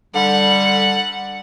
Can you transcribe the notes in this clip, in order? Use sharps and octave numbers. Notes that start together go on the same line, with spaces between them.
D3 G3 F#5